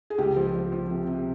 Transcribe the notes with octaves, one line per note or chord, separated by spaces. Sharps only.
G#4
C#2 G4
F3
F3
F3
C3
C3